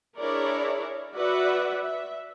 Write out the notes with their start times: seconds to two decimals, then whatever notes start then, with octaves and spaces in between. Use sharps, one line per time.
0.19 D4 E4 G#4 A#4 C#5 D5
1.14 F#4 B4 D5 E5 F#5
1.81 E5